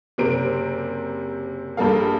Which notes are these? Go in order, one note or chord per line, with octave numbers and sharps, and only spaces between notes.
F#1 C3 A#4 C5 D7
A#1 G2 A4 A#4 F5